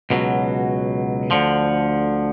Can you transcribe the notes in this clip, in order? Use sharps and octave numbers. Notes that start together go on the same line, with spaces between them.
C#2 B2 F#3
D2 D3 F3